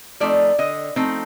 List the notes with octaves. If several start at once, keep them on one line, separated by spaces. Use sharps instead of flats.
F3 A3 C4 D#4 D5
D3 D#5
F3 A3 C4 D#4